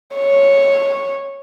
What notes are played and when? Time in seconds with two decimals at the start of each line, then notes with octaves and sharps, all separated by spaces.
0.15 C#5